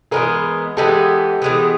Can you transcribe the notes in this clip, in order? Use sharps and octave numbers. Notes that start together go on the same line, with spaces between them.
E3 G#3 B3 G#4 A#4
E3 G#3 B3 G4 A4
E3 G#3 B3